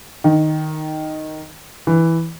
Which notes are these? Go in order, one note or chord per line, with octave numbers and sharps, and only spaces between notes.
D#3
E3